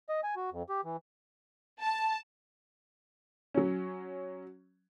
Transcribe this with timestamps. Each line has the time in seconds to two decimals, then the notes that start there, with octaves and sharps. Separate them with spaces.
0.09 D#5
0.24 G#5
0.36 F#4
0.52 F2
0.70 G4
0.84 E3
1.81 A5
3.54 F#3 C#4